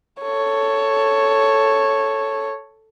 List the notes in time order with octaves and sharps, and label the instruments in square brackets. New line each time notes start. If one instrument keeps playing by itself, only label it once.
[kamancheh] A4 C#5